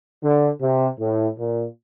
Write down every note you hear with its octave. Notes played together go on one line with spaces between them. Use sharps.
D3
C3
A2
A#2